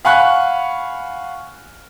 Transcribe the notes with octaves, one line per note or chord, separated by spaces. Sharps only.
F5 F#5 G#5 B5 C#6 F#6